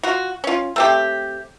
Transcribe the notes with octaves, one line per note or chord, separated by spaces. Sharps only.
F4 F#4
C#4 F4
A3 C4 G4